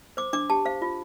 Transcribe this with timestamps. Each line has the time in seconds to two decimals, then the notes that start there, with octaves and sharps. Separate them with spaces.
0.17 C5 D6
0.33 D4 D6
0.50 G4 A5
0.65 C5 F5
0.82 F4